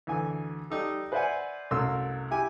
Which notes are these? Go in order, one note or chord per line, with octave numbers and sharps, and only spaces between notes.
D2 E3 G#5
G3 D#4 G4 A4
B4 C5 D5 E5 F#5 G#5
C2 F#2 A3 A#4 C6 E6
E4 G4 G#5